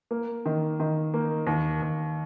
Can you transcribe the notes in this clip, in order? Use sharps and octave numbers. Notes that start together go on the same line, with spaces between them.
A#3
D#3
D#3
A#3
D#2
D#2